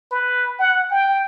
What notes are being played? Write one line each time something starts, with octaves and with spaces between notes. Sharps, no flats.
B4
F#5
G5